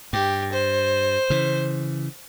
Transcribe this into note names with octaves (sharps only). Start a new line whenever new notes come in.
G2 G4
C5
C#3 E3